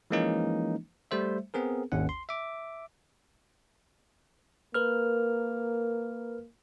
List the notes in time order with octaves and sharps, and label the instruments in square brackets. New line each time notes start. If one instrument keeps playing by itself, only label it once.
[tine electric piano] E3 F3 G#3 A#3 C#4 D#4
G3 A3 C5 E5
B3 C4 G#4 A#4
G#1 D#2 C#4 F#5
C6
E5 D6
[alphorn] A#3 [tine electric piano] A#4 B4 F6